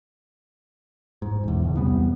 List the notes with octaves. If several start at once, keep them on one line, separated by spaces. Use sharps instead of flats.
G#2
E1 E2
C#2
E2 C3 G3 B3